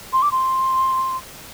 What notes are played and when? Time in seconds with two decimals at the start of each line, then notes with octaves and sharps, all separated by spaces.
0.13 C6
0.22 D6
0.32 C6